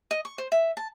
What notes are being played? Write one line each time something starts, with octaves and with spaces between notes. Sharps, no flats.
D#5
C#6
C5
E5
A5